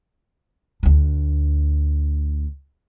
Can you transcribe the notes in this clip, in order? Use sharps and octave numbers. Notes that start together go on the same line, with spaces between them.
D2 D4